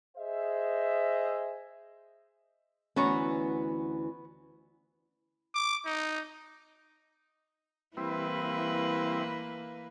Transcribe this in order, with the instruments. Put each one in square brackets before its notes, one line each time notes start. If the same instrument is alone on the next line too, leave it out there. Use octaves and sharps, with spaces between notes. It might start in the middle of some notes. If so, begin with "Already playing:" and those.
[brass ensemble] G#4 C5 D#5 E5
[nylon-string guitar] D2 E3 C#4 [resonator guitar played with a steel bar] B3 F#4 A#5
[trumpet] D6
D#4
[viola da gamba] E3 A#3 B4 [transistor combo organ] G3 C4 E4